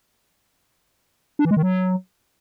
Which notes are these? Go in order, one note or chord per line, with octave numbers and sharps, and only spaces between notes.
D4
E3
G#3
D#3
F#3